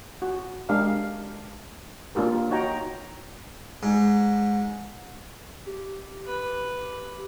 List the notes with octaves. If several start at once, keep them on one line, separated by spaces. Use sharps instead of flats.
F#4
G#3 D4 G4 A#4 F5
A#3 D4 F4 G4 A#4
D#4 F#4 C#5 G5 A#5
G#2
G4
B4